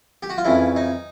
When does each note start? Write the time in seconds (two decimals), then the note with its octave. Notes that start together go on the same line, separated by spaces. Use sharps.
0.23 G4
0.30 F#4
0.38 F4
0.45 F2 C#3 E3 E4
0.76 D#4